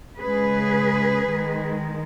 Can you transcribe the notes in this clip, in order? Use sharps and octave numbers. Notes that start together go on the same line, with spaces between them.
C#3 G#3 G#4 B4
D#3 G#3